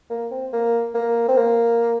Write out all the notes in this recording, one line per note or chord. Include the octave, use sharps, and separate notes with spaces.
A#3
C4
A#3
A#3
C4
A#3